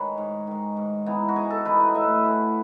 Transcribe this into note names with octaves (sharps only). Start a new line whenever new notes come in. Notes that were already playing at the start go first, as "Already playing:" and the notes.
Already playing: D#3 G#3 B4 C#5
G#2
D#3 G#3
G#2
E3 B3 D#4
F#4
G#2 G#4
A4
E3 B3 D#4 B4
D#5
A2 E5
D#5
E3 A3